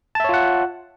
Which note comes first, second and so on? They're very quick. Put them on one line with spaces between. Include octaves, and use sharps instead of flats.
A5 E5 C#5 F4 F#5